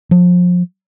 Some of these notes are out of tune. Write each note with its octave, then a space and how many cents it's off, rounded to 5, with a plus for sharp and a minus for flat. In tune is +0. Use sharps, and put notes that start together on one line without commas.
F3 +30